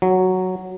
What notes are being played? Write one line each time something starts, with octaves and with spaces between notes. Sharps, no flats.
F#3